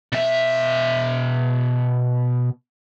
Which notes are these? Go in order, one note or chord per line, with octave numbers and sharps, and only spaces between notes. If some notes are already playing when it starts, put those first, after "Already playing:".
B2 E5